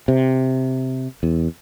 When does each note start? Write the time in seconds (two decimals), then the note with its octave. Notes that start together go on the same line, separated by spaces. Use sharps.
0.08 C3
1.23 E2